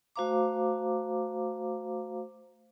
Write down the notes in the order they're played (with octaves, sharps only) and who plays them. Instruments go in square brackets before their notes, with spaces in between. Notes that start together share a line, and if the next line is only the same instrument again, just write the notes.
[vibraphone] A3 F#4 C5 F5 A#5 D6